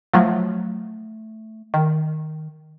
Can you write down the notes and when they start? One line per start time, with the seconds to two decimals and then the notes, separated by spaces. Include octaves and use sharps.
0.14 F3 F#3 A3
1.74 D#3